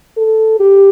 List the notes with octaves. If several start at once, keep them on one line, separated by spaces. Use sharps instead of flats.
A4
G4